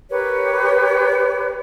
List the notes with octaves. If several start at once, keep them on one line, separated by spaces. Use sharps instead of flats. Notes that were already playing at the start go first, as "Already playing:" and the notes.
G4 A#4 B4 C#5